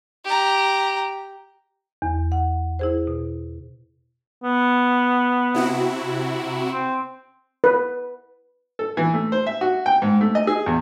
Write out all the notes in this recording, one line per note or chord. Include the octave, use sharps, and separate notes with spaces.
G4 A#5
E2
F#5
E4 G#4 C5
B2
B3
C3 E4 F#4
C4
B4
A4
E3
A3
C5
E5
F#4
G5
G#2
A3
D#5
G#4
E2